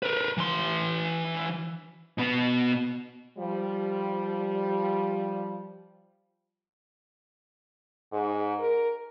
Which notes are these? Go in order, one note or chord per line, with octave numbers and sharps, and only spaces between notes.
A#4 B4
E3 C6
B2 B3
F3 G3
G#2
A#4